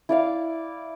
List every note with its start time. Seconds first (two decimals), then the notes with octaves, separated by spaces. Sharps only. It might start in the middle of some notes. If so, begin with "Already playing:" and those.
0.09 E4 D5 F5